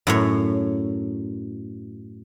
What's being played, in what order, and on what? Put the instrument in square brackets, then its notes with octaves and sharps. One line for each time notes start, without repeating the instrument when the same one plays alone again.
[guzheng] F#2 A2 C#5